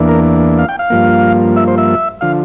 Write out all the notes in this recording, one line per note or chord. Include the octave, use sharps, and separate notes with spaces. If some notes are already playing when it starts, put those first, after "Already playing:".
Already playing: E2 E3 A#3 D4
A#4
F5
G5
F5
G2 F3 A#3
E5
C5
E5
D3 F3 F5